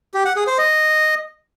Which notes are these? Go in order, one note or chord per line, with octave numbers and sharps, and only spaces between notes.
G4
F#5
G#4
C5
D#5